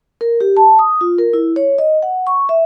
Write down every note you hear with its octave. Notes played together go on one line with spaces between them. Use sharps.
A#4
G4
A5
D#6
F4
A#4
E4
C#5
D#5
F#5
C#6
E5